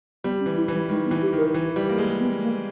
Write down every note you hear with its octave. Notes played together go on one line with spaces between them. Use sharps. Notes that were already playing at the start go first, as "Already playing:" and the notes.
G3 B3
C#4
E3
E4
E3 G3
D#3 G#3
B3
E3
G4
D#3 A#4
E3
G3
A#3
G#3
B3
A#3